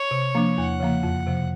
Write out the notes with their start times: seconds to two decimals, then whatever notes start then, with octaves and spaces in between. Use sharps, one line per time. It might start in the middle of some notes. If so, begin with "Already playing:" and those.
Already playing: C#5
0.11 C3
0.35 F3 A#3 D4
0.57 E2 F#5
0.80 C#3 F3 A#3
1.03 F2
1.27 C3 F3